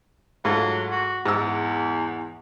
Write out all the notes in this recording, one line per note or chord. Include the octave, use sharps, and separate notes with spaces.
G#2 F#3 A3 F4
F#4
E2 G#2 E6